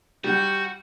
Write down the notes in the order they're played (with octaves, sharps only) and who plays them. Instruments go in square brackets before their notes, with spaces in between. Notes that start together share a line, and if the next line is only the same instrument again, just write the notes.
[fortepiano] G3 F#5 [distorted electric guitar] F#4 [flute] G6